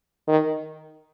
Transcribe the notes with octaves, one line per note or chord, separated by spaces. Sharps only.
D#3